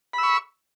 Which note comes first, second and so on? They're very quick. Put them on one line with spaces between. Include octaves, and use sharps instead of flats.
B5 E6 C#6